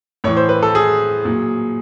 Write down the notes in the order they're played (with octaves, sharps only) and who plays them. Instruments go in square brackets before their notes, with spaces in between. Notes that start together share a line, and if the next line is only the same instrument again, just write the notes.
[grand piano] A2 E3 C#5
C5
B4
A4
G#4
A#2 F#3